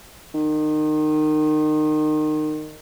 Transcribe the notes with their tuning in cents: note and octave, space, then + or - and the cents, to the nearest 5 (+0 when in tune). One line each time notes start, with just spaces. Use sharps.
D#3 -25